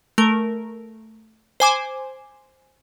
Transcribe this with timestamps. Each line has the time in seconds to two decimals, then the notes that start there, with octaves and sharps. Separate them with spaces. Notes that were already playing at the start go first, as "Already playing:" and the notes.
0.18 A3 A#4
1.60 C5 G#5 D6